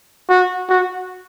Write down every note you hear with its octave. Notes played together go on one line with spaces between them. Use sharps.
F#4
F#4